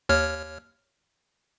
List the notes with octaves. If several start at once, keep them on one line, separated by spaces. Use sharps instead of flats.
D#2 C#5 F6